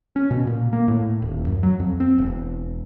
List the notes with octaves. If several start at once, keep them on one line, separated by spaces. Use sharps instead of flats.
C#4
B2
A#2
A#3
A2
D#1
F#2
F#3
F2
C4
E1